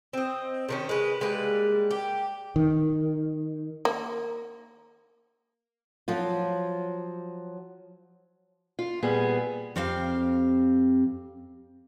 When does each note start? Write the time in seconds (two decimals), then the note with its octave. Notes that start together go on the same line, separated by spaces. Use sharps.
0.13 C4 D#5
0.69 C3 D#3 C#4
0.89 G#3 B4
1.20 G3 G#3 A#3 B4
1.91 G4
2.56 D#3
3.85 A#3
6.08 F3 F#3 F4
8.79 F4
9.03 A#2 G3 B3 G#4
9.76 F2 C4 G4 F5